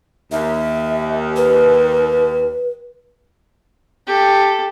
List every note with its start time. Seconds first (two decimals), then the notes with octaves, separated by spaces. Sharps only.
0.32 D#2 E5
1.36 B4
4.07 G4 A4